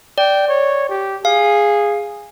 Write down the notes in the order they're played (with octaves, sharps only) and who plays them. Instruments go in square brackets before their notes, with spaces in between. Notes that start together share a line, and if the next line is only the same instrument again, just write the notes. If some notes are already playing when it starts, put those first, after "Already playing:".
[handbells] D5 [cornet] G5
[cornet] C#5
G4
[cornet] G#4 [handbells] F5